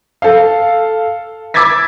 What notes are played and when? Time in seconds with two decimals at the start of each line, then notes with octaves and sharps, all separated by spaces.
0.22 A4 F5
1.54 B5 D6 E6 G#6 A6 B6